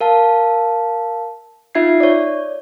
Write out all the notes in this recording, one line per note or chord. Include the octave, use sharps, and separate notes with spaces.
A#4 F5 A5
D#4 F4 E5 G#6 A6 C7
C#5 D5